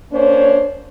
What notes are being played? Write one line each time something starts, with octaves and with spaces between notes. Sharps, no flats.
A#3 C#4 D4 C5 C#5